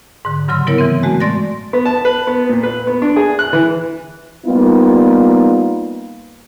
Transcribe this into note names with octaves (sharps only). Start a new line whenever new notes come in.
G#2 D3
G2 C#3 F#3 C6 E6
F#3 G3 B3 E4 A#4 C#5
E3 C4
G#3 A3 F#4
A2 D5 C6 A6 A#6
B3
A5
B4
B3
A#2
B4
B3
D4
G#4
F#6
E3
G3 A#3 B3 D#4 F4